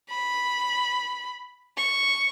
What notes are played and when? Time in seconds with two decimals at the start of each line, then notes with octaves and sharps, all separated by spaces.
0.10 B5
1.78 C#6